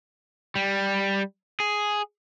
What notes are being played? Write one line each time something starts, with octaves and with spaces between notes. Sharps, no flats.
G3
G#4